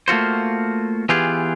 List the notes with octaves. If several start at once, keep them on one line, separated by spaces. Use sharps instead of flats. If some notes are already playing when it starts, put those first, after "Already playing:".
A3 A#3 F4 F#4 C5
E3 B3 F4 G4 G#4